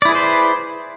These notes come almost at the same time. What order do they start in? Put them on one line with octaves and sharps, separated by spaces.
D5 E4 G#4 B4 C5